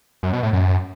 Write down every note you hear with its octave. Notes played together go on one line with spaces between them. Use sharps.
F#2
B2
A2
F#2